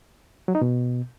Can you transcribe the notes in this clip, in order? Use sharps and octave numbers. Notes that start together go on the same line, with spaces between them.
F#3
D#4
B2